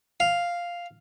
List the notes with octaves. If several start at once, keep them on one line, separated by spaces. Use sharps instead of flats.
F5